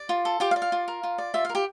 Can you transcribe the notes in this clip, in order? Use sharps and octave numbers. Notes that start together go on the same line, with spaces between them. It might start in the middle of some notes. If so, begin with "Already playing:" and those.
Already playing: D5
F4
A4
F4 G4 G5
F5
D5
F5
F4
A#4
F4
D5
F4 E5
F5
A#4
G4 G5